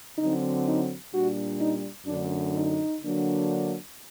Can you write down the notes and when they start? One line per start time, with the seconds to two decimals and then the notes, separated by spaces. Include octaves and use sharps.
0.19 D3 F#3 C4 D#4
0.66 D#4
1.13 A#2 G3 D4 F#4
1.59 D#4
2.06 F#2 D3 A3 D4
2.53 D#4
3.01 D3 F#3 A#3 D4